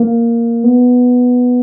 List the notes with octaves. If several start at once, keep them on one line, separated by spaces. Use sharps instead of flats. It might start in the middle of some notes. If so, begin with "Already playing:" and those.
Already playing: A#3
B3